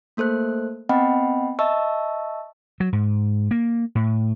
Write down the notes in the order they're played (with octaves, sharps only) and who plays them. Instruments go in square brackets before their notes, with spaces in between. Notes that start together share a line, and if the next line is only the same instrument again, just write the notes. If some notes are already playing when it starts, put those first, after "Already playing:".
[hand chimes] A3 A#3 A4 C5 F#6
B3 C4 D#5 F#5 G5 B5
D#5 E5 A5 C#6 E6
[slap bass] F#3
G#2
A#3
A2